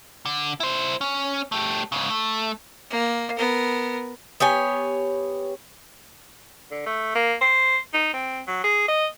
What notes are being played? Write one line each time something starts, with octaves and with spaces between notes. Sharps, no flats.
D3
E4 C5
C#4
A3 G4
G#2 C#3
A3
A#3
B3 A#4
B3 G4 C#5 G#5
D3
A3
A#3
C5
D#4
C4
F#3
G#4
D#5